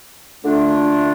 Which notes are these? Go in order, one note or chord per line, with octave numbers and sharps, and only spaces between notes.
D3 A3 D4 F4